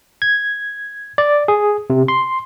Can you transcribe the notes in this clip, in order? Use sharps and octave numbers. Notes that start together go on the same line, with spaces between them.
G#6
D5
G#4
C3
C6